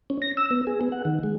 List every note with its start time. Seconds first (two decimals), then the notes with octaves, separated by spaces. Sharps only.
0.10 C#4
0.22 A#6
0.37 E6
0.51 B3
0.67 G#4
0.81 B3
0.92 F#5
1.05 D#3
1.23 G#3